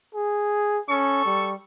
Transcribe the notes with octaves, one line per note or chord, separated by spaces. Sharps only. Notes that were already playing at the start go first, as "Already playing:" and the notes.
G#4
C#4 A4 C#6
G3